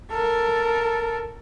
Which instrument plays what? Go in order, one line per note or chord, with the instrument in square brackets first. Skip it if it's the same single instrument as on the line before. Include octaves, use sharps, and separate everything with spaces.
[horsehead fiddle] A4 A#4